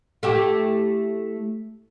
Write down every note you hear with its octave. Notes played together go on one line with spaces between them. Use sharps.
A3 E4 G4